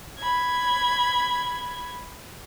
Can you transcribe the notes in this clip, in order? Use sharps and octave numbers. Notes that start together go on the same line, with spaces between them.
B5 G#6